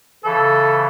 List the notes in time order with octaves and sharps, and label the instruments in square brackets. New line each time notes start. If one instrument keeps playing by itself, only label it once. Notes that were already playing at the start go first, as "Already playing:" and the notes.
[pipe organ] C#3 E3 [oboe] A4